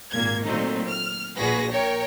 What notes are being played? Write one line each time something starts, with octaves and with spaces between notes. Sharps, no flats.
G#1 A#2 A#3 G#6
A#2 D#3 F#3 A3 C4 D#4
F6
A#1 A#2 F#4 G#4 B4 A#6
A#4 C#5 G5